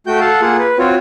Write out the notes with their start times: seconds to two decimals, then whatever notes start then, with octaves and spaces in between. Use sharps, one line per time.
0.07 A3 F#4 G5 G6
0.20 A4 F5 F#5 A5
0.41 A#3 F4 G#4 F#5
0.58 B4
0.78 C4 F4 F#4 C#5